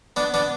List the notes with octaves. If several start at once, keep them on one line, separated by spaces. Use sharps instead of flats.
B3 D4
B3 D4